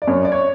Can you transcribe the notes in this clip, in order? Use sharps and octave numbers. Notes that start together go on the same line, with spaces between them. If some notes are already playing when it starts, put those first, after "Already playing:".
D5
F#2 C#5
D5
C#5